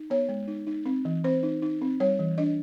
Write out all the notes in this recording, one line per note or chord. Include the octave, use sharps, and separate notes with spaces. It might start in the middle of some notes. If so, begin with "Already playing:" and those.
Already playing: D#4
B3 C#5
G#3
D#4
D#4
C4
E3
C4 C5
D#4
D#4
C4
G3 C#5
E3
D4 D#5